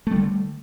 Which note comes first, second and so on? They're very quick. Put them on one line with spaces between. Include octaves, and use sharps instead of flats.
A3 G3 D3